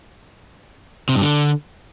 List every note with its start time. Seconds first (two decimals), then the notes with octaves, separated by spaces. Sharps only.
1.09 C3
1.15 G2
1.22 D3